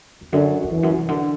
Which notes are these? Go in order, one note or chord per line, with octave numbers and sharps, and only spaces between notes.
E2
F#2 D3
F#2
E2 E3
F#2
C3
D3